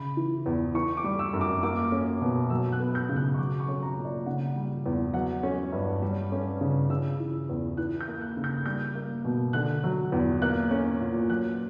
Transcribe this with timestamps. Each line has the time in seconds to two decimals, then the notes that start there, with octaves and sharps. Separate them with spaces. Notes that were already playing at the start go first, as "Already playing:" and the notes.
Already playing: C#3 B5
0.17 E3
0.46 E2
0.74 E3 C#6
0.97 D6
1.04 G3
1.19 E6
1.33 F#2
1.41 D6
1.63 A#3 D6
1.92 C#4
2.22 B2
2.50 F#3 E6
2.72 F#6
2.79 B3
2.95 G6
3.09 C#3
3.16 F#6
3.34 C#6
3.39 F#3 D6
3.60 C#6
3.68 C#4
3.83 A#5
3.97 A#2
4.05 D5
4.26 C#3 F#5
4.56 G3
4.86 E2
5.14 F#3 F#5
5.43 C#4
5.72 G2
6.02 G3
6.32 C#4
6.61 C#3
6.89 C#3 E6
7.20 E3
7.49 E2
7.77 E3 F#6
8.01 G6
8.08 A#3
8.21 F#6
8.37 C#3
8.44 G6
8.66 G3 G6
8.95 A#3
9.25 B2
9.53 D3 F#6
9.84 F#3
10.12 E2
10.42 A#3 F#6
10.71 C#4
11.01 A#2
11.29 F#3 F#6